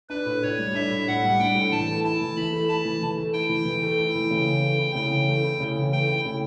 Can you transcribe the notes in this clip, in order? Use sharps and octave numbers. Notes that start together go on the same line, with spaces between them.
D4 B4
A2
A2 C#5
G3
D4 E5
A2
A2 F#5
G3
D4 G5
A2
E3 A5
A3
E4 A5
E3
E3 B5
A3
E4 A5
E3
E3
A3
E4 G5
E3
E3
A3
E4
E3
C#3
E3
A3
E4
C#3 G5
E3
A3
E4
C#3
E3
A3 G5
E4
C#3